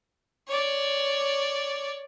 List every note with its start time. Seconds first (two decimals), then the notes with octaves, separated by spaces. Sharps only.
0.48 C#5 D5